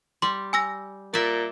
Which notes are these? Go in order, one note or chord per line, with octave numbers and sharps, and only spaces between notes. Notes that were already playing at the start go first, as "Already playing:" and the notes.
G3 C6
G#5 E6 A#6
A#2 D5 E5